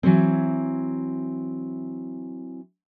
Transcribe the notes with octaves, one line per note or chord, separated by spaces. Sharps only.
E3 F#3 C4